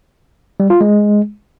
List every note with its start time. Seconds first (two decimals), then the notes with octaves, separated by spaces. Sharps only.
0.60 G3
0.70 F4
0.81 G#3